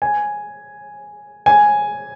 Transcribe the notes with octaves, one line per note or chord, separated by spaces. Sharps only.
G#5
G#5